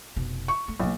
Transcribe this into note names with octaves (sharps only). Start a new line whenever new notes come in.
F1 B2
C#6
A3
B1 E3 A#3